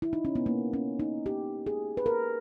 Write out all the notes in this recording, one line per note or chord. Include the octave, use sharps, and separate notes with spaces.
E4
D#4
C#4
B3
A#3
C#4
D#4
G4
G#4
B4
A#4